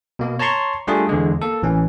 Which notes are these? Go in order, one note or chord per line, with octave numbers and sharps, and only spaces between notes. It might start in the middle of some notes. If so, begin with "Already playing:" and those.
B2 A#3
C#5 A5 A#5 C6 C#6
G3 A3 D4 F4 G#4
E2 D3 G#3
A#3 A4
A1 E3 C#4